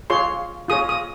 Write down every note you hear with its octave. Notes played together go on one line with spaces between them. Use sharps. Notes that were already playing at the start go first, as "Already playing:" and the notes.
F4 G#4 C#5 C6
F4 G#4 C#5 D#6
D#6